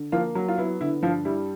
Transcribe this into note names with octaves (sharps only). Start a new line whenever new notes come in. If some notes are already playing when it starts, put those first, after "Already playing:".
Already playing: D3
F3 A#3 F4
F#3
F4
B3 E4
D3 E4
G2 F3 F4
G3 E4